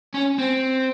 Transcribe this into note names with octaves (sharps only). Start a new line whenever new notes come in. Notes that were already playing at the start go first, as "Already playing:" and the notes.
C#4
C4